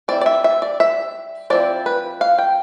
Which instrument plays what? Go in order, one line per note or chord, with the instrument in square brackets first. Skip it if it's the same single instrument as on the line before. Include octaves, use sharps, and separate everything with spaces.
[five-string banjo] G3 C4 E4 D5
D5
E5
E5
D5
E5
F3 C4 E4 D5
B4
F5
G5